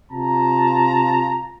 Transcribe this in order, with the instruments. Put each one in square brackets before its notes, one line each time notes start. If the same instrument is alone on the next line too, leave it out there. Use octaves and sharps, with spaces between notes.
[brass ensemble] C3 F4 A5 A#5